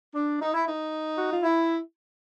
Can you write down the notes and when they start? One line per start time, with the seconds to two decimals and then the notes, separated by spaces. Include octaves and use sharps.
0.15 D4
0.41 D#4
0.54 E4
0.67 D#4
1.16 F#4
1.30 F4
1.43 E4